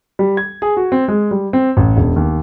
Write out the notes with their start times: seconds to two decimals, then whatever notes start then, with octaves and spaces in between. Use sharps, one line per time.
0.19 G3
0.37 G#6
0.62 G#4
0.77 F#4
0.92 C4
1.08 G#3
1.31 G3
1.53 C4
1.77 A1
1.97 E1
2.16 D#2